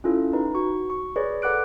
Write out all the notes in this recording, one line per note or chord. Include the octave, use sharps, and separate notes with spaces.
C#4 E4 F4 A4
D#4 B4
F#4 C#6
C#6
G#4 B4 C#5 D5
A4 B4 F#5 D6 F#6 D7